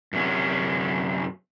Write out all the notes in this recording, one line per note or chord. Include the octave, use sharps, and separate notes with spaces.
F#2 C3 C#4